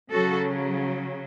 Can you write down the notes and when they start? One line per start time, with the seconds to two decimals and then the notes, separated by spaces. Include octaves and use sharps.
0.12 C#3 F#3 F#4 A4